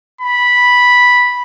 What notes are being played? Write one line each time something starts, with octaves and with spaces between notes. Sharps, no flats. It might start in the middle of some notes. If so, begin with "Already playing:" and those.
B5